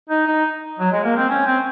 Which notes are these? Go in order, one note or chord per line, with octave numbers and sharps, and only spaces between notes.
D#4
D#4
F#3
G#3
A#3
C4
C#4
C4